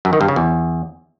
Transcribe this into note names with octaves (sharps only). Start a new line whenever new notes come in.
F#2
D#3
G2
C#3
E2